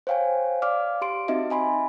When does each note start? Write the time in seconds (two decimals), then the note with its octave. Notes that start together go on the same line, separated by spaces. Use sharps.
0.07 C5 C#5 F5 G5 G#5
0.62 D5 F5 D6 F6
1.01 G4 C6 D7
1.28 C4 D#4 F#4 D#5 E5
1.50 D#5 G#5 B5 C6